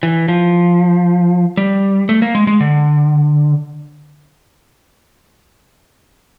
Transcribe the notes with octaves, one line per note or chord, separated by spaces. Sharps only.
E3
F3
G3
A3
A#3
G#3
G#3
D3